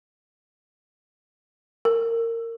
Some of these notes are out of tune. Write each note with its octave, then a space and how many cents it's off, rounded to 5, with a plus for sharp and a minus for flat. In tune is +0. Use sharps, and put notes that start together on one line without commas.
A#4 -25